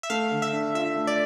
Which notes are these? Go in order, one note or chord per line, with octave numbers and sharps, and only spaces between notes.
E5
A3 F5
D3
E5
D4
F4 E5
A3
D5